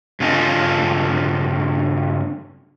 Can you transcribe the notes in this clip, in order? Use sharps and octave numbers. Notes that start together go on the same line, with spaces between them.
G2 C#3 F4 A4 D#5 G#5